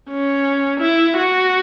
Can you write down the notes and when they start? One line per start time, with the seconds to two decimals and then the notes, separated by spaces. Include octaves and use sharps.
0.10 C#4
0.81 E4
1.17 F#4